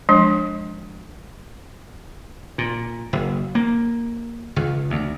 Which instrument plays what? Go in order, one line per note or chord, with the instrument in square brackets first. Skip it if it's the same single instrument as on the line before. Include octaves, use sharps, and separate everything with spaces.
[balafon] F3 G#3 D4
[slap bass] A#2
F#1
A#3
C#2
D2